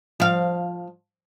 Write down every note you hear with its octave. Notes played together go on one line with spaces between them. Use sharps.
F3 F5